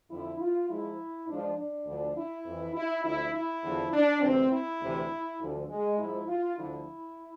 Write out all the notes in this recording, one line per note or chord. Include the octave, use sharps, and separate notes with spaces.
F2 D3 F3 E4
F4
G#2 F3 E4
G#2 F3 D4
D4
D2 D3 F3
E4
F2 E3
E4
D2 D3 F3 E4
E4
E2 D3 F3
D4
D2 C3 E3 C4
E4
D2 C3 E3
D2 D3 F3
G#3
G#2 F3 E4
F4
D2 D3 F3 E4